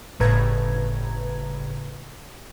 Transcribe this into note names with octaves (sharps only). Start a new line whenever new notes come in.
G1 A2 C#3 B4 A#5 G#6